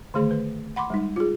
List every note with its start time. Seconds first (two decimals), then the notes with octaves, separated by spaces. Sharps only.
0.14 D3 D#3 A3 G#4 C5
0.31 B4
0.76 F#5 B5 C6 D6
0.90 G3 G#3 D#4
1.16 F4 G#4